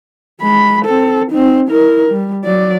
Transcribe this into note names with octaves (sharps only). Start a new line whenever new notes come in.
G#3 B5
C4 A4
C4 D#4
E4 A#4
G3
F#3 D5